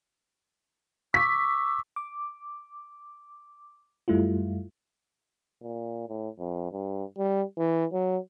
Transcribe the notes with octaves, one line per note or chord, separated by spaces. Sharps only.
C#6 D6 E6 B6
D6
F#2 G3 A3 E4 F4
A#2
A2
F2
G2
G3
E3
F#3